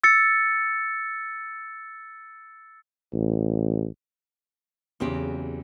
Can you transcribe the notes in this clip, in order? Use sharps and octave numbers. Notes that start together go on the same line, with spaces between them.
E6 A6 C#7
A1
E2 C#3 F#3 C4 G4